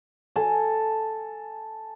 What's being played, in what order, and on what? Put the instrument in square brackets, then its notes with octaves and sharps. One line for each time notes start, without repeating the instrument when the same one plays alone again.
[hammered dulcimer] A4 G#5